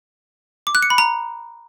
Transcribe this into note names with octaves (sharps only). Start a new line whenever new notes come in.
D6
F#6
C#7
B5
A#5